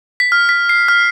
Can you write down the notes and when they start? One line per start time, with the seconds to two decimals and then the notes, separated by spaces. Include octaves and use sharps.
0.20 B6
0.32 F6
0.49 B6
0.69 C7
0.88 F6